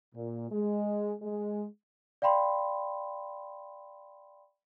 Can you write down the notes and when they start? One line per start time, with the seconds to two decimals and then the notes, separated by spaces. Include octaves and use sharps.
0.15 A#2
0.51 G#3
1.21 G#3
2.22 D5 F5 G5 B5 C6